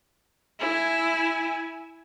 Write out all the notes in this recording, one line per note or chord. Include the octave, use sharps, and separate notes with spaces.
E4 G#5